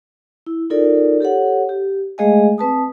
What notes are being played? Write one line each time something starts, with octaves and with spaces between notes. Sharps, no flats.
E4
D#4 F4 A4 A#4 D5
G4 A4 C#5 F#5
G4
G#3 A3 G#4 D#5 F5 G#5
C4 B4 A5 D#6